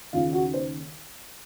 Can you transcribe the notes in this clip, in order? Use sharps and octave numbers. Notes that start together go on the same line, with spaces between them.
D#2 C#3 F4
F#4
C5